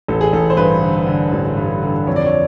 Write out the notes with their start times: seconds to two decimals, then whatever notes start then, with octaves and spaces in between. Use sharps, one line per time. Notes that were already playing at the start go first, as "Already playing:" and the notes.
0.08 A1 A4
0.21 G#4
0.33 A1 A4
0.50 C5
0.57 G2 B4
0.82 D3
1.07 D3
1.32 A1
1.57 G2
1.83 D3
2.07 F2 C#5
2.16 D5
2.26 C#5